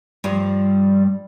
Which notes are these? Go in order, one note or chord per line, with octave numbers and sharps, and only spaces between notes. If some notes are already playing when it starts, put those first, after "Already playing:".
G2 F3 G3